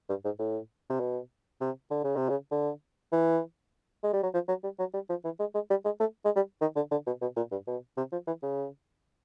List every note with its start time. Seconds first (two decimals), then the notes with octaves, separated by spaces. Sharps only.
0.09 G2
0.25 G#2
0.39 A2
0.89 C3
1.00 B2
1.61 C3
1.91 D3
2.04 C#3
2.16 C3
2.29 C#3
2.51 D3
3.12 E3
4.03 G#3
4.13 G3
4.23 F#3
4.34 F3
4.48 F#3
4.63 G3
4.79 F#3
4.94 G3
5.10 F3
5.24 E3
5.40 G#3
5.54 G#3
5.70 G3
5.85 G#3
6.00 A3
6.25 G#3
6.36 G3
6.61 D#3
6.76 D3
6.91 D3
7.06 B2
7.21 B2
7.36 A#2
7.51 G2
7.67 B2
7.97 C3
8.12 F3
8.27 E3
8.43 C#3